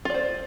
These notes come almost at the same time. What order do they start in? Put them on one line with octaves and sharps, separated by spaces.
F4 D5 C5